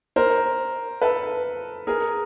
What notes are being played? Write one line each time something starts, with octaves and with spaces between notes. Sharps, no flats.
A#4 C5
A4 B4
G#4 A#4